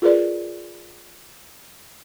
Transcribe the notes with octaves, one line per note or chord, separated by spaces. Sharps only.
F4 G#4 A#4 B4 D5